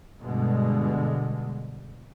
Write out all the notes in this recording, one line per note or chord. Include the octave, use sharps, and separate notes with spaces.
G2 B2 D3 G#3